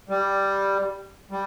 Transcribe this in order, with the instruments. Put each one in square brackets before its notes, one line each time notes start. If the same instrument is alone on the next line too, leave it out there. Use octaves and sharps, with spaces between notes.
[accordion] G3
G3